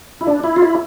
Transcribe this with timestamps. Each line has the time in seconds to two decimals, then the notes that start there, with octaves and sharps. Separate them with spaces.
0.21 E4
0.27 D4
0.44 E4
0.56 F4
0.62 E4